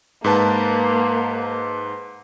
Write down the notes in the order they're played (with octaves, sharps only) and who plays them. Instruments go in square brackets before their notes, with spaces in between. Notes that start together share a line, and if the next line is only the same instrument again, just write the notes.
[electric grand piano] G#2 B4 A5 [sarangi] A#3